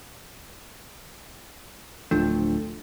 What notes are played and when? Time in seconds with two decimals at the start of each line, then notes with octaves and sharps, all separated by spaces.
2.11 D1 F3 A3 D4